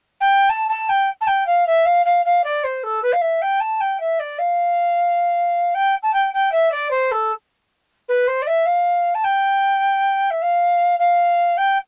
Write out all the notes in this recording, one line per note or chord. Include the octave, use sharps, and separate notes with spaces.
G5
A5
A5
G5
A5
G5
F5
E5
F5
F5
F5
D5
C5
A4
B4
F5
E5
G5
A5
G5
E5
D5
F5
G5
A5
G5
G5
E5
D5
C5
A4
B4
C5
D5
E5
F5
A5
G5
E5
F5
F5
G5